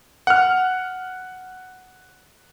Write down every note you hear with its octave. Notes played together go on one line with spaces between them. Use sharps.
F#5 F6